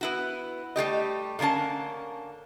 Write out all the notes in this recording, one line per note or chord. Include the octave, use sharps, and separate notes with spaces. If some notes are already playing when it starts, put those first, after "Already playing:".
B3 E4 F#4
G3 A3 G4 D#5
A#2 D3 A#3 C#4 A5